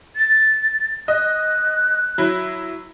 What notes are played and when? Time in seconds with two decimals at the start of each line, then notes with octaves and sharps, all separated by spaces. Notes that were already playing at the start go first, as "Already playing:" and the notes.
0.16 A6
1.08 D#5 F#6
2.18 F#3 E4